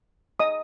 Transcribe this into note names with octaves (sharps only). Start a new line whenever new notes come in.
D#5 D#6